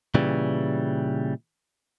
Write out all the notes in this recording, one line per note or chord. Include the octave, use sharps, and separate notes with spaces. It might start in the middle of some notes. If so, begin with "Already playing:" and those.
A#2 C#3 E3 G3